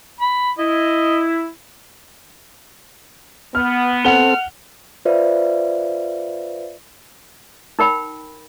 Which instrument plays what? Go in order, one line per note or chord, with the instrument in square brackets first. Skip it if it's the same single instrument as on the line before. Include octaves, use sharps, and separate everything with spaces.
[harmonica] B5
[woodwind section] E4 [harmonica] D#5
[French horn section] B3 [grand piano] F6
[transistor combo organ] C4 A4 [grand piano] F#5 G7 [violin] F6
[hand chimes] F4 B4 C5 D5 E5 F5
[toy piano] D#4 A#4 G5 B5